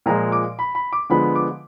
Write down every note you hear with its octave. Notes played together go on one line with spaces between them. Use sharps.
A#2 F3 G#3 A#5
D6
B5
B5
D6
D3 F3 G#3 B3 B5
D6